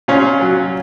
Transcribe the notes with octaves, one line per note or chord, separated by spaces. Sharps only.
A#2 C#4 F4
F#3